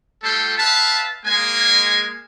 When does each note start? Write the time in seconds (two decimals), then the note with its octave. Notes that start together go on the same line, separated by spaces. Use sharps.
0.23 G3 A3 F4 A4 G5 C6
0.58 B4 E5 F5 A5
1.25 G#3 A#3 G#5